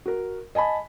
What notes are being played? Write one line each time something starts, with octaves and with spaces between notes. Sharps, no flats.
F#4 A#4
D#5 G#5 A5 B5